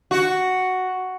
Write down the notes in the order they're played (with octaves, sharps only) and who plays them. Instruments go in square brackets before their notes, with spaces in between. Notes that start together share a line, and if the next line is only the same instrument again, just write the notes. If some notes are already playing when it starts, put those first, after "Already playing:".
[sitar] F#4